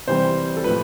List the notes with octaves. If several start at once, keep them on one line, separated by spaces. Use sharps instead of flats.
C3 E3 G3 C5
A4
A2 F3 B4